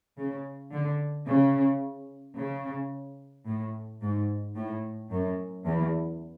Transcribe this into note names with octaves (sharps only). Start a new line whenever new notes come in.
C#3
D3
C#3
C#3
A2
G#2
A2
F#2
E2